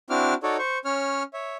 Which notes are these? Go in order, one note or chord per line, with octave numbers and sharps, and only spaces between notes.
C4 D4 E4 F#4 D6 F6
D#4 F#4 A4 C#5 D5
C5 C#6
C#4 C#5 F6
C#5 E5